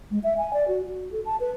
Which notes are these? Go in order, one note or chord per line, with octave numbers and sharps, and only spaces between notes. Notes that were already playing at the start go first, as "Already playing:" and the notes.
G#3
E5
G#5
D5
F#4
F#4
A4
A5
B4